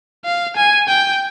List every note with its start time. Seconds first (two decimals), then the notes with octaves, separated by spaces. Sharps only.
0.25 F5
0.56 G#5
0.89 G5